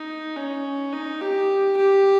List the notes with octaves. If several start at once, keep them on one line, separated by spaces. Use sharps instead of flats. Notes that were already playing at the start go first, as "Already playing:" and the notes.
Already playing: D#4
C#4
D#4
G4
G4